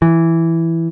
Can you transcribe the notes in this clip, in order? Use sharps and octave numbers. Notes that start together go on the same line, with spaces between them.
E3